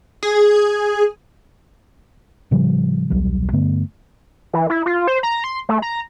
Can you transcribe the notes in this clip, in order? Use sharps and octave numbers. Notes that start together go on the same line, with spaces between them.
G#4
A2 C#3 F3 G3
D#1 B1 F#3 G3
G2 D3 A3 B3
E3
E4
F4
C5
A#5
C6
A3
A#5